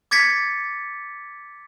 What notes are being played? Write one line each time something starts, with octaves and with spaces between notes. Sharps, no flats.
D6 G#6 A6 B6 C#7